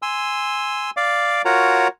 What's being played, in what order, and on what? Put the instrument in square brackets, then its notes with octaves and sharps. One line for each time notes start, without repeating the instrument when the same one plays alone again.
[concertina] G#5 C6 E6
D5 F5 D6
F4 F#4 A#4 C#5 F#5 A#5